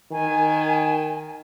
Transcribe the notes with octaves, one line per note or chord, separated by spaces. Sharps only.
D#3 G#5